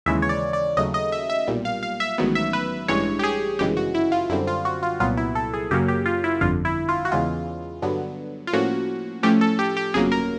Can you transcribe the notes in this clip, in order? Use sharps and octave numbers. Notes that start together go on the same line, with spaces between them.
D#2 C#3 E3 G#3 E5
C#5
D5
D5
D#2 C#3 F#3 A3 D#5
D#5
E5
E5
B1 A#2 G3
F5
F5
E5
A1 G#2 D#3 F#3 B3
E5
B4
A1 G2 E3 G#3 C#5
G4
G#4
G1 F#2 C#3 E3 G#3 G4
F#4
E4
F4
F#2 D3 G3 C4 E4
F4
F#4
F4
C2 A#2 F#3 B3 F4
E4
A4
G#4
F#2 C#3 F#3 A#3 C#4 G4
G4
F4
E4
G1 F2 D3 F4
E4
F4
F#4
E2 C#3 E3 G#3 F4
G2 D3 F#3 B3
F4
A2 F3 A#3 C#4 F#4
A2 F3 A3 C#4 G4
A4
G4
G4
G1 F2 C#3 F#3 A#3 G#4
A#4